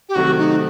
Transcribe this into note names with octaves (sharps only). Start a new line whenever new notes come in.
G4
C3 D#3 F#3 A3 F#4
D#4